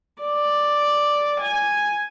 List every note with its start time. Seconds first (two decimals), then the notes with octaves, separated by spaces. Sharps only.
0.22 D5
1.41 G#5